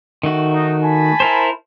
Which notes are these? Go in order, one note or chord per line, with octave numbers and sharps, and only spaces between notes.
D#3 A3 F#4
D#4
G#5 A5 B5
E4 A#4 C5